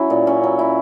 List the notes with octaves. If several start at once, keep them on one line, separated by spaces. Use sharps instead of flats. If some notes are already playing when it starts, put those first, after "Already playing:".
Already playing: F#3 C#4 E4
A#2
C#4
F#3
E4